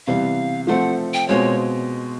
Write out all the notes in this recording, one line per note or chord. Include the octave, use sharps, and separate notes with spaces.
C3 E3 G3 B3 F5
F3 A3 C4 F#5
G5
B2 G#3 C4 F4 C#5